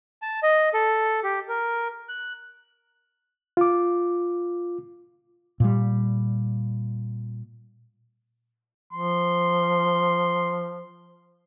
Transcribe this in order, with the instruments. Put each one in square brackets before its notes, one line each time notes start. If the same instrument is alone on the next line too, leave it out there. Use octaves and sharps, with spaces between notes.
[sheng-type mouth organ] A5
D#5
A4
G4
A#4
F#6
[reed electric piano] F4 D6
[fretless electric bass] A#2 G3
[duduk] F3 [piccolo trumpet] C6